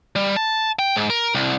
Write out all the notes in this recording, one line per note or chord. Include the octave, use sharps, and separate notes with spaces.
G3
A5
G5
G#2
A#4
C2